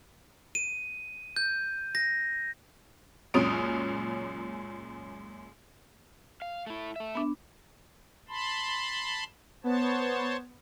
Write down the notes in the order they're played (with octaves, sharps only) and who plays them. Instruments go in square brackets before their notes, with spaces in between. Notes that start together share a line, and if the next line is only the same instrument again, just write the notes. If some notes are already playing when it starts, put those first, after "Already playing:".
[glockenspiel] D#7
G6
A#6
[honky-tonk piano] C#2 F#2 A#2 C#4 D#6 D7
[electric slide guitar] F5
A3 E4
A3 E5
[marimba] B3 D4
[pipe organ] A5 B5 C6
[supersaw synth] B3 [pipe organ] C5 C#5 A5